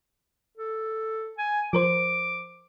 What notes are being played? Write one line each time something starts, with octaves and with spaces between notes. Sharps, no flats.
A4
G#5
F3 A#4 C5 D6